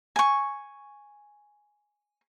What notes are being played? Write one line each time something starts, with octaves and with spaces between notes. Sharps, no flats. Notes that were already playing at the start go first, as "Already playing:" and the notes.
G#5 C#6